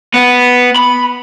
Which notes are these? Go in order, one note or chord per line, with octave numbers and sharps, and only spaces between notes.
B3
B5